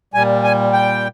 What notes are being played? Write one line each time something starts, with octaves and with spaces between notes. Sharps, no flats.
A#2 G3 G#5
G#5
G5